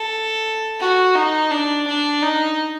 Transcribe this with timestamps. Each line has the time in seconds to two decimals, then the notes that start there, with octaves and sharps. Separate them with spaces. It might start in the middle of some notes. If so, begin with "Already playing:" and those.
Already playing: A4
0.80 F#4
1.15 D#4
1.51 D4
1.87 D4
2.23 D#4